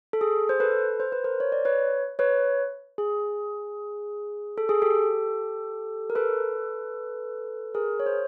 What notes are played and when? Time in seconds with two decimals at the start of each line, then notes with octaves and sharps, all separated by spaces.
0.13 A4
0.21 G#4
0.49 C5
0.60 A4 B4
1.00 C5
1.12 B4
1.24 A#4 C5
1.40 C#5
1.52 D5
1.65 B4 C#5
2.19 B4 C#5
2.98 G#4
4.58 A4
4.69 G#4
4.82 G4 A4
6.10 A#4
6.15 A4 B4
7.74 G#4 A#4
8.00 C#5
8.06 C5